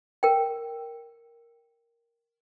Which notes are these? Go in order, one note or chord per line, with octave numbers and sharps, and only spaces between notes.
A#4 G5